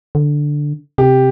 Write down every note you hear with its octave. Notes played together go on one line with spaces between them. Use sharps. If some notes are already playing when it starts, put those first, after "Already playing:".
D3
C3 G4